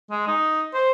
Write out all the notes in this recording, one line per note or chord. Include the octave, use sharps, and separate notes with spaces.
G#3
D#4
C5